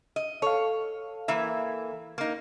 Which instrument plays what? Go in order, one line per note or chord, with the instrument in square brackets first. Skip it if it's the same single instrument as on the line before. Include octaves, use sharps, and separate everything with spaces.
[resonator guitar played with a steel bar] D#5
[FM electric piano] A4 F5 [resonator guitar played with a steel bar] C#5
[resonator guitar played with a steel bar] E3 A#3 E5
A#3 D#4